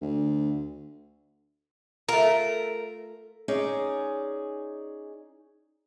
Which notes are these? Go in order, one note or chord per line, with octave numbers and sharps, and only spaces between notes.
D2
A3 F4 A#4
C#4 D#4 G#4 D5